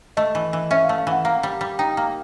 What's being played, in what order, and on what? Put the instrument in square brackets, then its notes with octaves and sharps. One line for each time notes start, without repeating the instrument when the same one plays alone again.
[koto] A3 [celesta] D#5
[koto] E3
E3
[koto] C#4 [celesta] E5
[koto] A3 [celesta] F5
[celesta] F5
[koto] E3 [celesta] F#5
[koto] A#3 [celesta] F5
[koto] G3
G3
[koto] D#4 [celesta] G5
[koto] A#3